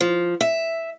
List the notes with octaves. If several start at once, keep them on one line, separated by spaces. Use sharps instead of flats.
F3
E5